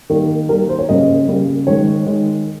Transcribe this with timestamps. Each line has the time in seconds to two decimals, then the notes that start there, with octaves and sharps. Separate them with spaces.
0.10 D#3 G3 A#3
0.49 D#3 G3 A#3 A#4
0.69 C5
0.79 C#5
0.89 C#3 G3 A#3 D#5
1.28 C#3 G3 A#3
1.67 D#3 G#3 C#5
2.07 D#3 G#3